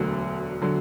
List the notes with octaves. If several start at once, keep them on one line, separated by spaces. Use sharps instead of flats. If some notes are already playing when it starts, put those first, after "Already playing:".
Already playing: E1 D2 D3 F#3
D3 F#3